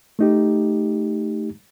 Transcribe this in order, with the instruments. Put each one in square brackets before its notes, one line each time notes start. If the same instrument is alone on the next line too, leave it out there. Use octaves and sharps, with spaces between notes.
[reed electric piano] A3 D#4 G4